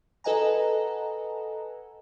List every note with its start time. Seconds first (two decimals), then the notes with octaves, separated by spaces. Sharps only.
0.24 A4 B4 D#5 F#5 G#5 A#5